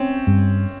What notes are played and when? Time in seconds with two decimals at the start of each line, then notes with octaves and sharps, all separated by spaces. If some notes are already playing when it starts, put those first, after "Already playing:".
Already playing: C4 C#4
0.27 G2